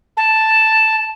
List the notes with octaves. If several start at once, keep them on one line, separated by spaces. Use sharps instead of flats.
A5